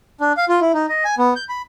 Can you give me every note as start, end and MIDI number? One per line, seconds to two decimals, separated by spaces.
0.21 0.33 62
0.37 0.45 77
0.48 0.60 65
0.61 0.72 64
0.74 0.86 63
0.89 1.04 75
1.05 1.15 80
1.18 1.34 59
1.36 1.44 91
1.49 1.62 83